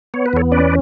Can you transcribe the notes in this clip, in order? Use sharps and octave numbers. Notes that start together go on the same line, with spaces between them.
B3 C#5
B4
E2 A4 C#5
C#4 B4 D5